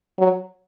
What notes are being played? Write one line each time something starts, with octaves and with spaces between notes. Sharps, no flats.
F#3